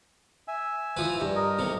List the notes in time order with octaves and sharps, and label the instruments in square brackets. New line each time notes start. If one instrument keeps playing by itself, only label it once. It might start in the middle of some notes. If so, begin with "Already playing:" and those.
[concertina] E5 G#5
[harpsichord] E3 F3 B4
G2
[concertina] A#4 D#5
[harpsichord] B1 C3